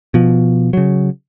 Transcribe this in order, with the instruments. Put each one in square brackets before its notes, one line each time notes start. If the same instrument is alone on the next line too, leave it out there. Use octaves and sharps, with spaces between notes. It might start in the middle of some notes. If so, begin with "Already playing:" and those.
[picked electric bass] B2 F3
C#3 F#3